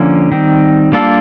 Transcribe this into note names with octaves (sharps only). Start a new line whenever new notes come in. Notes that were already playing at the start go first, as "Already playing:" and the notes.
Already playing: D3 F3 A#3 C#4
D#3 G3 C4
G3 A#3 D4 F4 A4